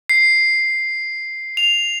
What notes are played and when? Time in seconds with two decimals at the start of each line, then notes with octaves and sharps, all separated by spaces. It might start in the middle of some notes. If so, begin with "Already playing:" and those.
0.09 C7
1.57 F7